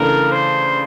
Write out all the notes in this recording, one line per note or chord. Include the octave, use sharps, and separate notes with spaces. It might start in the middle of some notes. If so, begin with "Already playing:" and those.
Already playing: C#3 E3 A3 D4 A#4
C5